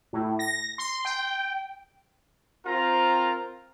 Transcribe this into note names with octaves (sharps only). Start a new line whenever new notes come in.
A2
A#6
C6
G5
C4 F4 A#4 A#5